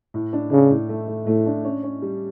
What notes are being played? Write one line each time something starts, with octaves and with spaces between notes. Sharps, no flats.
A2
D4
C#3 D4
A2
A3
A3
A2 A3
D4
C#4
C#4
G3